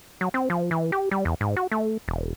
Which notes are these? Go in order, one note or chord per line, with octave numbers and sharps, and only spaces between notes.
F#3
C4
F3
E3
G4
G3
E2
G#2
F#4
A3
E1